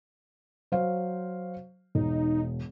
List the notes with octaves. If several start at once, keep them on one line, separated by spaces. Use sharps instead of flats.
F#3 C5 F5
E1 D#4